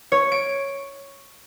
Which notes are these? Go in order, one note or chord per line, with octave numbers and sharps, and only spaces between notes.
C#5
D7